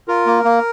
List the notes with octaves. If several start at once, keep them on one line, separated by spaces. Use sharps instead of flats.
F4 A#4
A#3
A#3